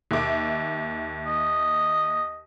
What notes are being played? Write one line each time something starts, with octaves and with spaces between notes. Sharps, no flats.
D#2 E5 D6
D#5